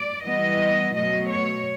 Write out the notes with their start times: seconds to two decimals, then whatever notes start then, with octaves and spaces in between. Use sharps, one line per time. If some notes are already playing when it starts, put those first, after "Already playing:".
Already playing: D5
0.25 E3 G3 B3 D#5
0.95 B2 F#3 A3 D#5
1.31 C#5